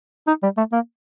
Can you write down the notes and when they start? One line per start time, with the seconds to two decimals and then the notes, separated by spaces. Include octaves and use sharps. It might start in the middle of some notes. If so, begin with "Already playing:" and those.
0.27 D#4
0.43 G3
0.57 A3
0.72 A#3